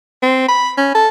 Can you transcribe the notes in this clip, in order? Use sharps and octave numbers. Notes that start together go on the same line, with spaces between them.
C4
B5
C#4
A4